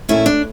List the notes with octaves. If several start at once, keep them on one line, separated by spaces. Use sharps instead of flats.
A#2 A3 C#4 E4
D4